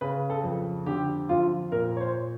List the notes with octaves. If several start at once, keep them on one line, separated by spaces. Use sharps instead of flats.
C#3 B4
A4
F2
D3 G4
F2 F4
A#2 A#4
C#5
C5